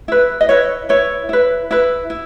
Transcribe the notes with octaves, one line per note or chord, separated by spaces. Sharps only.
E4 B4
D#5
E4 B4 C#5
E4 B4 C#5
E4 B4
E4 B4
E4